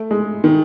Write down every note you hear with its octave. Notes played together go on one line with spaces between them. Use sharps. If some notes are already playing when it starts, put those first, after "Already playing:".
Already playing: A3
G#3
D#3